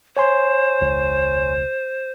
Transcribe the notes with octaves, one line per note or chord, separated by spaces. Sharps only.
C5 C#5 G#5 C6
E1 C#2